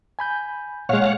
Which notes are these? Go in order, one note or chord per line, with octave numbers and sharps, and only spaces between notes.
G#5 B5 G6
A#2 G#3 C#5 F5 F#5